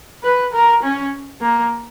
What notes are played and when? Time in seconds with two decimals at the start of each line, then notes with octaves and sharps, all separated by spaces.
0.24 B4
0.53 A#4
0.83 C#4
1.41 A#3